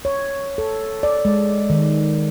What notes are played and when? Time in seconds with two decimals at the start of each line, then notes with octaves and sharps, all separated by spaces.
0.05 C#5
0.58 A4
1.03 D5
1.25 G#3
1.70 D#3